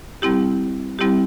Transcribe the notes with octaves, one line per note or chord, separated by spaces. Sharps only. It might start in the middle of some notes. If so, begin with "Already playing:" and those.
G3 C4 E4 G4
G3 C4 E4 G4